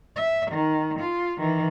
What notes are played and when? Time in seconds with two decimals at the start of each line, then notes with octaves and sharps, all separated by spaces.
0.16 E5
0.52 D#3
1.00 F4
1.38 D#3 E3